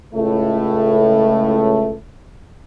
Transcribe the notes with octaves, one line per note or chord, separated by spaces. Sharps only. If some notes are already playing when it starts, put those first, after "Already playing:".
C#2 A2 A3